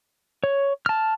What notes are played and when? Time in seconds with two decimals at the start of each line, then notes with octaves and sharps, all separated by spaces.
0.44 C#5
0.86 A5 F6